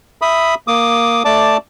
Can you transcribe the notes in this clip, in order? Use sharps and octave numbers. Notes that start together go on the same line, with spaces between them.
E5 B5 D#6
A#3 D6 D#6
A3 D5 A5 D6